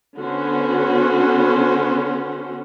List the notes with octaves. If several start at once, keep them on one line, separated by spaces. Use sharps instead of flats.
D3 B3 C#4 F#4 C5